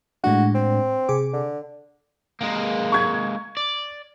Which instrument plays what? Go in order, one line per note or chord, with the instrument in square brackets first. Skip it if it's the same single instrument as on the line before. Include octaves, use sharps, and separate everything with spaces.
[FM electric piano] A2 G#3 D4 [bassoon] F#4
[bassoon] C4
[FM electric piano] C3 G#4 D6
[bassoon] D3
[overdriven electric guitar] G#3 A#3
[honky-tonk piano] C#6 G#6
[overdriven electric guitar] D5